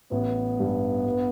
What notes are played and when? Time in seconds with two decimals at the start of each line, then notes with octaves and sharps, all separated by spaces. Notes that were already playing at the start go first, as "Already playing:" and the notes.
0.12 A1 B3
0.59 G2 G3
1.06 G2